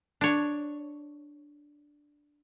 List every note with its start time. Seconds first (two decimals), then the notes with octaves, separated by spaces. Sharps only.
0.21 D4 C#5